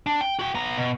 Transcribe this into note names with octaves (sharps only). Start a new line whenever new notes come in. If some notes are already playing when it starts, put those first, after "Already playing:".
D4
G5
F#4 G5
B3 A#5
B2